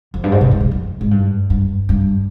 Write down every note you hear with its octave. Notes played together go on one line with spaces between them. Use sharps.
F2
G2
G#2
C3
G#2
G2
F2
G#2
G2
G2
G2